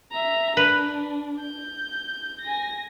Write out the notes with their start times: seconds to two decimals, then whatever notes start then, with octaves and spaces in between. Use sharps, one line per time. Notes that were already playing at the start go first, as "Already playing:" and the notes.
0.12 E5 A#5
0.57 D4 B4
1.40 G6
2.41 G#5 A#6